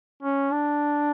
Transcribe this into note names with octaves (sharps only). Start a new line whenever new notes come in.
C#4
D4